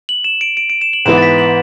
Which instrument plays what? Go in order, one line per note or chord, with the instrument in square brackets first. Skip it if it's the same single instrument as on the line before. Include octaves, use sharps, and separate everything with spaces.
[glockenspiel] F#7
E7
D7
D7
D7
E7
F#7
[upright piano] G#2 E3 B3 [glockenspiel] E7
[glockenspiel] A6
B6
F#7